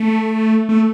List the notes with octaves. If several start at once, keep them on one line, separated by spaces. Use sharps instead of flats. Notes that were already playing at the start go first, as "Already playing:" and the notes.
Already playing: A3
A3